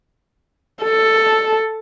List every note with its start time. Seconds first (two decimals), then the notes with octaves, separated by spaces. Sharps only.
0.83 A4